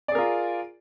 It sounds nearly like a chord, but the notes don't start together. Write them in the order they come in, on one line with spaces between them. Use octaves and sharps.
D5 G#4 A#4 F4